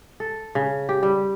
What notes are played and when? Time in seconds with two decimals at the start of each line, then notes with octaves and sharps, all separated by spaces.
0.20 A4
0.55 C#3
0.89 G4
1.03 G3